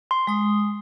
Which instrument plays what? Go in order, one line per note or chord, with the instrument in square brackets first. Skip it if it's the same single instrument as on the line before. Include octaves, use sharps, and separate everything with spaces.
[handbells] C6
[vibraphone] G#3 D#6